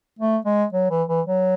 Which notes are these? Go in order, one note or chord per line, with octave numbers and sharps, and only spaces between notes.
A3
G#3
F#3
E3
E3
F#3